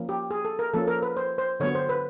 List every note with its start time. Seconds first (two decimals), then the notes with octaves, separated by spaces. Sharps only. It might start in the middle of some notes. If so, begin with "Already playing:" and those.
Already playing: F3 A#3 C#4
0.09 G4
0.31 G#4
0.45 A4
0.59 A#4
0.74 F3 A#3 C#4 A4
0.87 A#4
1.02 B4
1.17 C5
1.38 C5
1.60 D3 F#3 B3 C#5
1.75 C5
1.89 B4